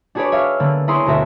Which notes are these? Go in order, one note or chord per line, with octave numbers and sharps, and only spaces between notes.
D4 F#4 G#4 B4 C#5 D5
C#5 E5 F5
D3 A#3 B3
E4 G#4 C#5 A#5 C6 D#6
D2 B2 F#4 A#4 E5